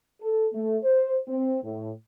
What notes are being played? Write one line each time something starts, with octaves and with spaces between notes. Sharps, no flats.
A4
A3
C5
C4
A2